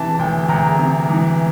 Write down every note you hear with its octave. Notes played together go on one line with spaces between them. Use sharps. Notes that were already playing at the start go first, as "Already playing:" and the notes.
Already playing: C3 E3 A5
D2 G5
D2 A#5
C3
E3